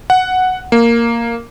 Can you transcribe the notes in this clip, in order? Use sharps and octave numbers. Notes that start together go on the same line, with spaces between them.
F#5
A#3